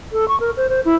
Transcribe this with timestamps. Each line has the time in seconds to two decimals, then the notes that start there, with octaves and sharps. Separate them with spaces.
0.12 A4
0.28 C#6
0.40 A#4
0.57 C5
0.69 C5
0.85 E4